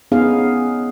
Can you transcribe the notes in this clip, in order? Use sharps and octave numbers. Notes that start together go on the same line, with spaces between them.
B3 C#4 D#4 G#4 F5